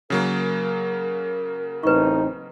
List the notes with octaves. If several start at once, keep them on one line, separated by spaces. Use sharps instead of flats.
C#3 F#3 A#3 A#4
A1 C4 D#4 B4 C#6